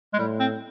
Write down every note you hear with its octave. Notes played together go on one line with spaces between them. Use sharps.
G#3
A2 G3
C4